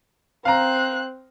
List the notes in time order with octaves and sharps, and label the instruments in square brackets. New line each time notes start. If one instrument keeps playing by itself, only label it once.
[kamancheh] C4 F#6 [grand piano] F5 A#5